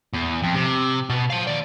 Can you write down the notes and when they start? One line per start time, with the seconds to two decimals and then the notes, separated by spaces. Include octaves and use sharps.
0.13 E2
0.42 F2
0.55 C3
1.09 B2
1.30 F5 A5
1.47 D#2 D5